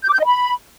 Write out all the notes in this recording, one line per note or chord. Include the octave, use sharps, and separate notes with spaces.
G6
D6
G6
D#5
B5